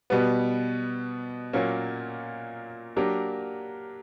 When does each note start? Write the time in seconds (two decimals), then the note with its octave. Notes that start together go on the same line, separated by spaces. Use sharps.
0.10 B2 G3 B3
1.53 A#2 F#3 A#3 C#4
2.96 F#3 A#3 D4 G4 A#4